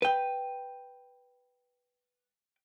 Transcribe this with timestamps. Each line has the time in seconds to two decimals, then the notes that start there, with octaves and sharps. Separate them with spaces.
0.02 B4 G5